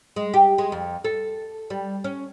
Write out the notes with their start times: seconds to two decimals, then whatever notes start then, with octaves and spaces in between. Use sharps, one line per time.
0.16 G#3
0.34 G4
0.58 G#3
0.72 F2
1.05 A4
1.70 G3
2.04 C#4